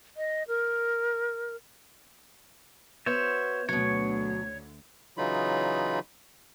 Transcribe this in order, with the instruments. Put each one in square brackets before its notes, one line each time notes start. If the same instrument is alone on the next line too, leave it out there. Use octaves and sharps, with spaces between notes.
[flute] D#5
A#4
[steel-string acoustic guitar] B3 F#4 [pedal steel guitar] C5 C#5 E5
[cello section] D2 D3 [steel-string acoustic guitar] B2 F#3 [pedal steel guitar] C#5
[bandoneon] C#3 E3 F#3 D#4 F4 B5